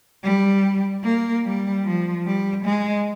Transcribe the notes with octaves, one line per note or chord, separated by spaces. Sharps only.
G3
A#3
G3
F3
G3
G#3